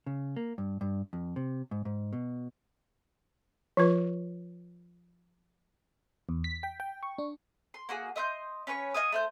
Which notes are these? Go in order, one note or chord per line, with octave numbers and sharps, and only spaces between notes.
C#3
A#3
G2
G2
F2
C3
G#2
G#2
B2
F3 F4 B4
E2
B6
G5
G5
C#6
D4
C6
A#3 F#4 G#4
D#5 E5 C6 G6
C#4 B4 C#5 C#6
D#5 F5 G#5 D#6
A3 C5 G6